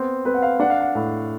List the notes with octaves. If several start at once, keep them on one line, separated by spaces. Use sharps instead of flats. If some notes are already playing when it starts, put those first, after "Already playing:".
Already playing: B3 C4
C4 B4
F#5
F5
D4 F#5
F5
F#5
A2